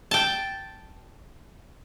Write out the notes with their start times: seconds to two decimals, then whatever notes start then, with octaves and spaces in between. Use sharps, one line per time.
0.11 G5 A5